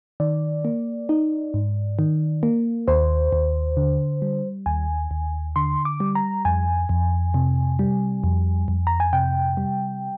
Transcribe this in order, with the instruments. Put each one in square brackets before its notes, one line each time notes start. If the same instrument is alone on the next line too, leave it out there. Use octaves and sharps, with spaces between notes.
[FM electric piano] D#3 D5
A#3
D#4
G#2
D#3
A#3
D#2 C5
D#2
D3
G3
D#2 G#5
D#2
D3 C6
D6
G3
A#5
F2 G#5
F2
C3
G3
F2
F2
A#5
G#5
C3 G5
G3